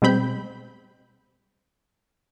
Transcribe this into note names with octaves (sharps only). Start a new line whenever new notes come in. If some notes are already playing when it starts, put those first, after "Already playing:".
B2 G3 G#3 C4 B5 G6